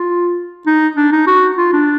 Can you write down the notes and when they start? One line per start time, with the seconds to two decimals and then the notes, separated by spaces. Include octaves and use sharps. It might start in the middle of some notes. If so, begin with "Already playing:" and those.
Already playing: F4
0.67 D#4
0.97 D4
1.12 D#4
1.27 F#4
1.58 F4
1.73 D4